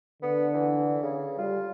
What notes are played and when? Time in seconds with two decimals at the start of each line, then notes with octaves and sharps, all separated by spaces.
0.22 D3 B3
0.54 E3
1.03 C#3
1.38 G3 F4